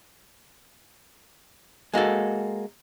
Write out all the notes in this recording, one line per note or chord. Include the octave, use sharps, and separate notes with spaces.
G#3 A#3 F#4 A4